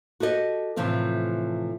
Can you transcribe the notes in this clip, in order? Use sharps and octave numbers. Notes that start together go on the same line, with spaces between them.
F#4 G4 A4 D5 D#5
A2 C3 E3 F3 A3 C4